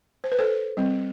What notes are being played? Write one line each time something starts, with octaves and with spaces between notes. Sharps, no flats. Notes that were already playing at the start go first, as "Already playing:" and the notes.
C5
B4
A4 C5
G3 C4